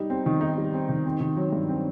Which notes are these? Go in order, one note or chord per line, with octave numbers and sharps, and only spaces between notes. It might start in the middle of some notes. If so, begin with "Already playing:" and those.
Already playing: G3 D#4
C4
D#3
D#4
G3
C4
D#3
C4
D#3
F#3
G2
C4